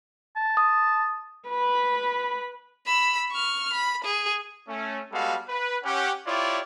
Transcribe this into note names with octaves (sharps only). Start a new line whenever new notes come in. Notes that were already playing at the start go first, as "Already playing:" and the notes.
A5
D#6
B4 B5
B5 E6
C#6 F6
B5
G#4
A3 C#4
G3 G#3 B3 F#4 A4 F5
B4
C#4 G4 F#5
E4 F4 G4 C#5 D5